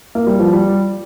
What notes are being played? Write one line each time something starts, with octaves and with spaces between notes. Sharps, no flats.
A#3
G3
F3
G3